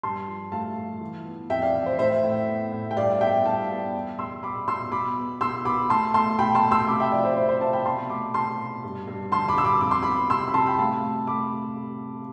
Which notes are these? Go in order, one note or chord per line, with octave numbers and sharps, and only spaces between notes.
G2 A5 C6
F3
A3 F5 A5
F3
E3
B3
F2 E5 G5
D5 F5
E3
C5
A2 C5 E5
A2
B3
A2
G5
G2 D5 F5
B3 E5 G5
G2 F5 A5
B3
E2
E2 C6 E6
B2 B5 D6
B2 C6 E6
B2 B5 D6
B3
B2 C6 E6
B3 B5 D6
A3 A5 C6
A3 A5 C6
B2 G5 B5
A5 C6
A3
C6 E6
C3 B5 D6
E5 G5
F3 D5 F5
C5 E5
C3 C5
C5 E5
C3 F5 A5
G5 B5
B2 A5 C6
A3 B5 D6
B2 A5 C6
B2
G2
G2
D3 A5 C6
B5 D6
G2 E6
B5 D6
F2 D6
C6
B3 B5 D6
C3 C6 E6
B5
C3 A5 C6
G5 B5
A3 F5 A5
A3
A3 B5 D6